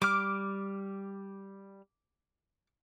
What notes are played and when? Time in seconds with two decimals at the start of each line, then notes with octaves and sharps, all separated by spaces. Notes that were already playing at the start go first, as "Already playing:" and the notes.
0.02 G3 D6 F6